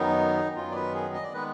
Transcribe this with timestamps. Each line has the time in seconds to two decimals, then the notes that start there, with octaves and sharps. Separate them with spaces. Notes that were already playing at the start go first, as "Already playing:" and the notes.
Already playing: F#2 D#3 F#3 B3 D#4
0.55 F#2 D#3 F#3 B3 F4
0.71 D5
0.75 B4
0.94 G#4
1.14 D#5
1.23 D5
1.34 D#3 G#3 B3 B4